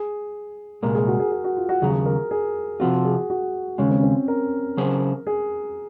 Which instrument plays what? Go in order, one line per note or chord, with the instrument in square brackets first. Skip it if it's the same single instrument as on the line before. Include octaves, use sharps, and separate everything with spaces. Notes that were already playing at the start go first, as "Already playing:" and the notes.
Already playing: [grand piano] G#4
[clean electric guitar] C2 A#2 G#3 [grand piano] A#4
[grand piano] G#4
F#4
G#4
G#4
F#4
F4
F#4
[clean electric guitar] D#2 C#3 F#3 [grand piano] G#4
[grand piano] A#4
G#4
[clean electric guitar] C3 F3 C4 F4 [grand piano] F#4
[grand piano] G#4
F#4
[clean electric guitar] D#2 C#3 G#3 [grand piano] C#4
[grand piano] C4
C4
A#4
[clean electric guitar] C#3 F#3 C#4 G#4 C5
[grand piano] G#4